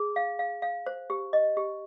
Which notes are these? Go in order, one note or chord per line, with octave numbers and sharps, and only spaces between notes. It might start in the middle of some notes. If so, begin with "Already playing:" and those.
Already playing: G#4
F5
F5
F5
C5
G4
D#5
G4